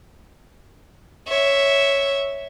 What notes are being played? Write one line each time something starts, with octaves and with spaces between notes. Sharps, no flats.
C#5 E5